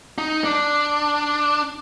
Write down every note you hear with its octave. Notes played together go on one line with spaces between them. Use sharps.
D#4
D4